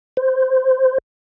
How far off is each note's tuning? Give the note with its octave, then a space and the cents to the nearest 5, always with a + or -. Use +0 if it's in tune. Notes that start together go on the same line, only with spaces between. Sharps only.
C5 -5